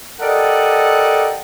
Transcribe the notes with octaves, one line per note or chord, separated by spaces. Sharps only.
G4 A4 A#4 D5 D#5 F#5